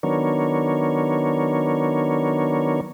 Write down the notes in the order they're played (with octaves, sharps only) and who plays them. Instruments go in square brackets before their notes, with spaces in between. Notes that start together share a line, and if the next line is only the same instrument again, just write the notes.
[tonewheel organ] D#3 F#3 B3 D4 A#4 C#5